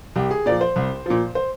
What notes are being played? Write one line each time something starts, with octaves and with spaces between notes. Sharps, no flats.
C2 G4
G#4
A#2 F3 D5
C5
C2
A#2 F3
C5